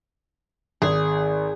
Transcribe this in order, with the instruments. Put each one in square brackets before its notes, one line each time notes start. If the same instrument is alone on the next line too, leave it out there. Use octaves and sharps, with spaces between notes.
[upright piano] G#1 [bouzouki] G#4